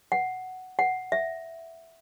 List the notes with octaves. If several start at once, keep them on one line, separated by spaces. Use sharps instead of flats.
F#5
F#5
E5